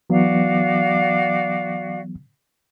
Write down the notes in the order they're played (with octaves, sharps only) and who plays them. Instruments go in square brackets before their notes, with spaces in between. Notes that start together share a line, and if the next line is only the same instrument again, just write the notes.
[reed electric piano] E3 F#3 B3 [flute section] F#4 D5 F5